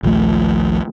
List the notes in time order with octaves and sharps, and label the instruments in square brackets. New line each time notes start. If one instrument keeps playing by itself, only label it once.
[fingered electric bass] A#1 D#2 F3 A3